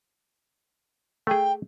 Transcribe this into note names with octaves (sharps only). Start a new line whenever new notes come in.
A3 G#4 G5